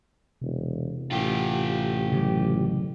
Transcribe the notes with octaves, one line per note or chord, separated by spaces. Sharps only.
E1 C3
A1 F4 G4
C#3 F#3